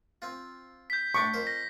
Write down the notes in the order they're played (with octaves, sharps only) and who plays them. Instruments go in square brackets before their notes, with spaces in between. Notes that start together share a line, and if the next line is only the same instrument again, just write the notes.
[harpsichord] C4 F4
[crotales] G6 B6
[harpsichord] A2 D4 G5 [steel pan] C#6 D6 [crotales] B6
[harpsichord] F2 A#4 C5
[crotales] A#6